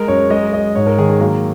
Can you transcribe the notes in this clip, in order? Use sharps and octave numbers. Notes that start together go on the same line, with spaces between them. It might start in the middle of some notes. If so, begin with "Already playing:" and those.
Already playing: G#3 A#4
F#2 C#5
G#3 D#5
G#3 D#5
G#2 C#5
A#4
D#3 G#4
G#4
F#3 A#3